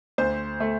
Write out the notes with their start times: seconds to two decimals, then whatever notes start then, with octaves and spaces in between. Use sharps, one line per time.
0.18 D2 C5
0.60 A3